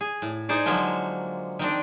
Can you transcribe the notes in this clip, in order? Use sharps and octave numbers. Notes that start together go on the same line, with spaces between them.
G#4
A2
D#4 G#4 C5 D5
D3 F3 F#3 G#3 A#3
D#3 C4 D4